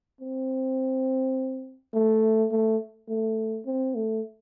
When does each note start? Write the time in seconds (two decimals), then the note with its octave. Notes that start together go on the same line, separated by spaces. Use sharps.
0.21 C4
1.94 A3
2.51 A3
3.09 A3
3.66 C4
3.95 A3